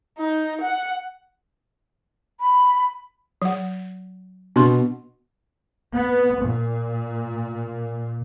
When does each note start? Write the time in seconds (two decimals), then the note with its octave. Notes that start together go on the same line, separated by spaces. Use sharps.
0.18 D#4
0.61 F#5
2.40 B5
3.42 F#3 F#5
4.56 B2 D4 C6
5.94 B3
6.43 A#2